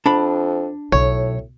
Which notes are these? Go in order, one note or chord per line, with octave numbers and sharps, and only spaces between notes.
F2 D4 B5
B1 A2 C#5